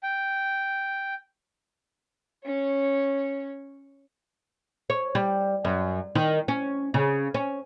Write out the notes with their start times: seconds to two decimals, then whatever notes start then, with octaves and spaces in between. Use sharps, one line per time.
0.03 G5
2.45 C#4 C#5
4.90 C#5
5.15 G3
5.65 F#2
6.15 D#3
6.48 C#4
6.94 C#3
7.34 C#4